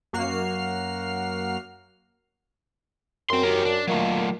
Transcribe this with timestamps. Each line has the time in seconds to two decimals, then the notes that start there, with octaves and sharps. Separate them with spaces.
0.13 F#2 A#3 F#4 F6 C7
3.30 F#2 C4 C6
3.43 G4 A#4
3.65 D4
3.88 A#2 D#3 F#3 A3 A#3